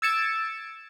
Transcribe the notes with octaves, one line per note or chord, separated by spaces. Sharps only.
E6 G#6 A6 C#7 D7 E7